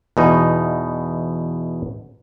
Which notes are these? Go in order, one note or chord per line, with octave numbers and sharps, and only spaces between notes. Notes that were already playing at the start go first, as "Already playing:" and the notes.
E2 B2 D#4